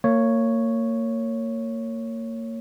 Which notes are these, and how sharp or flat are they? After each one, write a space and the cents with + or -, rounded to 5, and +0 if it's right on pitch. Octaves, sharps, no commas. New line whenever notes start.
A#3 -30 C#5 +0